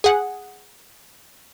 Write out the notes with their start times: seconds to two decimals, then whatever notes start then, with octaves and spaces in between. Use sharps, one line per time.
0.04 G#4 F#5